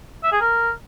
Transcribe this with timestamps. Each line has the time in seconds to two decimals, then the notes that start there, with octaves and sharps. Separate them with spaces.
0.23 E5
0.32 G#4
0.41 A#4